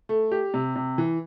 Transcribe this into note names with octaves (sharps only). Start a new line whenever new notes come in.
A3
G4
C3
C3
E3